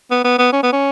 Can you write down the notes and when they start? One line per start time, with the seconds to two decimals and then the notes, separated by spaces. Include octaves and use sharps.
0.11 B3
0.24 B3
0.39 B3
0.52 C#4
0.63 B3
0.73 C#4